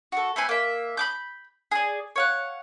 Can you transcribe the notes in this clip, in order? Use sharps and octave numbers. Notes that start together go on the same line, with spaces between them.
F#4 A4
A3 C4 B4 G#5
A#3 E5
B5 D6 G6
G#4 D5
C#5 F5 F#5